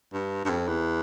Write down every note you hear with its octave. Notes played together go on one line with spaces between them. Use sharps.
G2
G2
F2
E2